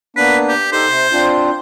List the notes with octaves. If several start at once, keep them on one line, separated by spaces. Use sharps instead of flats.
A#3 B3 D4 B4
G4
D#4 G4 A4 C5
C3
C4 D4 F4